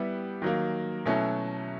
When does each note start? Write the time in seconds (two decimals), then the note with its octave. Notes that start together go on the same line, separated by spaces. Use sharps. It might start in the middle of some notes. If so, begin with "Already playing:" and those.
Already playing: G3 B3 E4 G4
0.42 D#3 F#3 A#3
1.06 B2 F#3 A3 C#4 E4